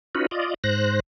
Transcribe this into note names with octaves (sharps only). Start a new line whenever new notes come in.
C#4 D#4 F4 F#4 B4
F4 D5 D#5
G#2 C5 F#6 A#6